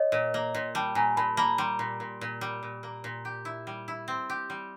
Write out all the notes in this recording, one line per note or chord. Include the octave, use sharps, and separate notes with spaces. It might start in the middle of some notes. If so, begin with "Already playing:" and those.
Already playing: C#5 D#5
A#2
A#3
A#2
G3 G5 A5
A#2 G#5 A#5
A#2 A5 B5
A#3 A5 B5
G3 A#5 C6
A#2
A#2
A#2
G3
A#2
A#3
A#2
G4
E4
G3
E4
C4
G4
G3